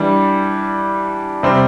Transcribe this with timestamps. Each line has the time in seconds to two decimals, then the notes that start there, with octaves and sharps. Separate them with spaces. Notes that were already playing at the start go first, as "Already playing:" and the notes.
Already playing: E3 G3 D4
1.43 C3 G3 C4